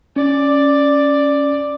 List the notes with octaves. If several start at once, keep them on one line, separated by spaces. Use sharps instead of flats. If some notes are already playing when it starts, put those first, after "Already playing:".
C#4 D5